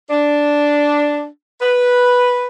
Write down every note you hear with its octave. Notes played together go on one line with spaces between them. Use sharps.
D4
B4